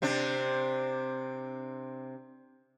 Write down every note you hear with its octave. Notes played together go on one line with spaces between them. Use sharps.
C3 C4 D4